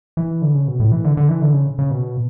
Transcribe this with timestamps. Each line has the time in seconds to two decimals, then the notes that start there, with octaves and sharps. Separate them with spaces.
0.17 E3
0.42 D3
0.55 C#3
0.68 B2
0.80 A2
0.92 E3
1.04 D3
1.17 D3
1.29 E3
1.42 D3
1.54 C#3
1.79 C#3
1.91 B2